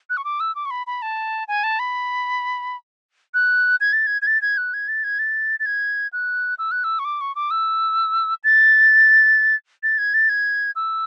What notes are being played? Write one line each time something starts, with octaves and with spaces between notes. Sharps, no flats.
F#6
C#6
D6
E6
D6
C#6
B5
B5
A5
G#5
A5
B5
F#6
G#6
A6
G#6
G#6
A6
G#6
F#6
G#6
A6
G#6
A6
A6
G#6
F#6
E6
F#6
E6
C#6
D6
C#6
D6
E6
A6
A6
G#6
A6
G#6
E6